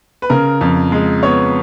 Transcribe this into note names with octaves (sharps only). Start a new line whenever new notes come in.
B4
C#3 A#4
F2
G#3
B3 C#5